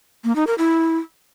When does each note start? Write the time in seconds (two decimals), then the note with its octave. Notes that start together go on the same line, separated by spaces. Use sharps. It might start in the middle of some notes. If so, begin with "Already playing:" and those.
0.24 A#3
0.35 D#4
0.47 A#4
0.58 E4